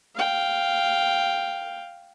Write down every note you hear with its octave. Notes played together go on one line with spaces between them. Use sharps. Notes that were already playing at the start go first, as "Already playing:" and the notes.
F5 G5